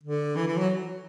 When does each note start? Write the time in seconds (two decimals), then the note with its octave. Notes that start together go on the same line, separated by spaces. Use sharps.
0.03 D3
0.36 E3
0.47 E3
0.58 F#3